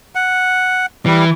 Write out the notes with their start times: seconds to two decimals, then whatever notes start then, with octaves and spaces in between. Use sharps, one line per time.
0.15 F#5
1.06 E3 G3